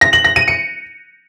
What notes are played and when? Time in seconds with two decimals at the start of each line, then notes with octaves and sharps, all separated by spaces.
0.01 A#6
0.13 F#7
0.24 A#6
0.36 D#7
0.48 C#7